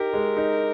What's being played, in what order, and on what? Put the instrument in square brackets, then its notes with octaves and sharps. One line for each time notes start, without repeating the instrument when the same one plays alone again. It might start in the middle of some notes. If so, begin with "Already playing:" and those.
Already playing: [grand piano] D#4 G4 [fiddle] A#4
[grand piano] G#3
D#4